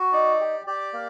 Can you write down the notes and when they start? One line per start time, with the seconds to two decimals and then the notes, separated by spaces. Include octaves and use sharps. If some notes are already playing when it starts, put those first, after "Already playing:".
Already playing: F#4
0.12 D#4 D5
0.40 G4
0.67 G4 D5
0.93 A#3